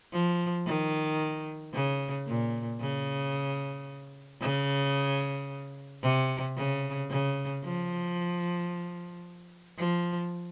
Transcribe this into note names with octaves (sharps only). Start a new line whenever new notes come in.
F3
D#3
C#3
A#2
C#3
C#3
C3
C#3
C#3
F3
F3